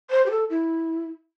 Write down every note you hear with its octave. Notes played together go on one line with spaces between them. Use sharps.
C5
G4
A4
E4